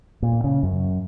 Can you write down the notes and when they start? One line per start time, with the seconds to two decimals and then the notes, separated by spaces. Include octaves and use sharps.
0.22 A#2
0.44 C#3
0.63 F#2